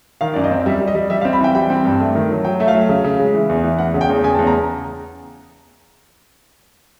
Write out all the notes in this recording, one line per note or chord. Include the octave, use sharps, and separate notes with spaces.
D#3 F5
F#2 D5
D#5
C4
G3 E5
G3
D#5
G3
G3 E5
F5
C4
B5
E3 G5
G3 G5
C4
G2
A3
D#3
F#3
F#3 G5
A3 E5
F5
F#3
C#3
C#3
G#3
E3
E2
E3
E2 F#5
C#3
G5
E2
C#3 G#5
A5
E2
A#5